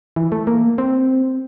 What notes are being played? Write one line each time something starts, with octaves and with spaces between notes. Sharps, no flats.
E3
A3
A#3
C4